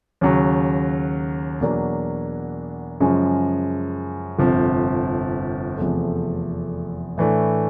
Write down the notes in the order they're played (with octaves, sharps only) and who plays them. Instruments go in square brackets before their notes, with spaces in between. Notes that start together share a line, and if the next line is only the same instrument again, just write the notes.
[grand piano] D#2 C#3 F#3
E2 B2 F#3 A#3 D4
F#2 C#3 F3 G#3
G1 F2 C3 F3
F1 E2 C3 F3 A3
A2 E3 A3 D4